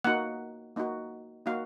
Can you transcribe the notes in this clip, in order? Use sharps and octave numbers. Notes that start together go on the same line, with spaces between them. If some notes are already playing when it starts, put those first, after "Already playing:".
A#3 D#4 F#4 F#5
A#3 D#4 F#4
A#3 D#4 F#4 F5